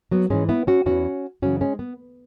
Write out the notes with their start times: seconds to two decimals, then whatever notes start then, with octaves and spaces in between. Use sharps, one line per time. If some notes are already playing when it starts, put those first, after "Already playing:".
0.11 F#3 B3
0.30 G#2 E3 G#3 C#4
0.49 B3 E4
0.67 C#4 F#4
0.86 E2 E3 C#4 F#4
1.42 F#2 C#3 E3 C#4 F#4
1.61 G#3 C#4
1.79 B3